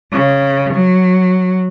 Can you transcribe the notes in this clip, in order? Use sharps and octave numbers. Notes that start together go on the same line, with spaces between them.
C#3
F#3